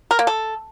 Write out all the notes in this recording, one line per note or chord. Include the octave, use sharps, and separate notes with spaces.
A#4
A#3
A4